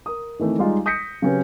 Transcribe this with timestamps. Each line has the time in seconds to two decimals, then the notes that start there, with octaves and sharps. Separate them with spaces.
0.06 A#4 D#6
0.39 D#3 E3 A3 C4
0.59 G3 G#3 D#4 F4
0.86 D#6 G6 A#6 B6 C#7
1.22 C#3 F#3 C4 C#4 G4 B4